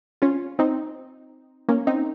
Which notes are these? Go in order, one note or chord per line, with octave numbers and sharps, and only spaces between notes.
C#4 F4
C4 D#4
A#3 C#4
C4 D#4